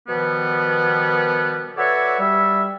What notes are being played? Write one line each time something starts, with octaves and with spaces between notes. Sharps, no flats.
B2 D#3 F3 G3 B3
F#4 A4 B4 C#5 D5 E5
G3 E5